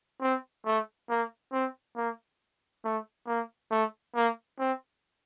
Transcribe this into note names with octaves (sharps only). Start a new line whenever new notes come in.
C4
A3
A#3
C4
A#3
A3
A#3
A3
A#3
C4